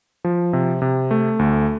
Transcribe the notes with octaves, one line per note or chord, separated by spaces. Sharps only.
F3
C3
C3
A3
D2